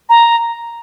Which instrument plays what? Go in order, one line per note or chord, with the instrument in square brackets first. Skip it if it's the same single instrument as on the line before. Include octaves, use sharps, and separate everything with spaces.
[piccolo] A#5